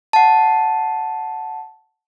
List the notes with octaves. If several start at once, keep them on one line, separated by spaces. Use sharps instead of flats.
F#5 A5